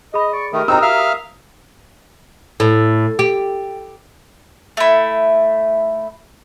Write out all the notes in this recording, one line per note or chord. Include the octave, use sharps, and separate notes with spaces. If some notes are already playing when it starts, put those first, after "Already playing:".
G#4 D#5 B5
D5 C#6
D#3 A3 G4 A#4 D#6
C4 D#4 A#5 E6
E5 F5 F6
A2
G4
A3 E4